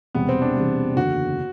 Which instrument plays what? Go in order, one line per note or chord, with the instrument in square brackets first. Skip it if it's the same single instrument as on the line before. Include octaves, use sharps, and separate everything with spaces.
[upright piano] E1 E2 C3 G3 [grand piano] B3
[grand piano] C4
D4
[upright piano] E1 E2 C3 G3
[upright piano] F#1 E2 D3 [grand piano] F#4